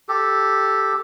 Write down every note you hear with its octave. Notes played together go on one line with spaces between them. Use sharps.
G4 A4